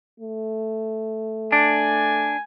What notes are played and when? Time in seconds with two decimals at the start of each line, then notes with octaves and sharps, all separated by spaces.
0.20 A3
1.52 D4 G#5